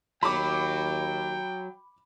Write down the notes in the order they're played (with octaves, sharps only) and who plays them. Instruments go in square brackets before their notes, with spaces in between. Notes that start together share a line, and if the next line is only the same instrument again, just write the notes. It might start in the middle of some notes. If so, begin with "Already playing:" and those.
[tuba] D#2 [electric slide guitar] F#3 [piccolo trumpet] G5 [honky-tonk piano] B5 D6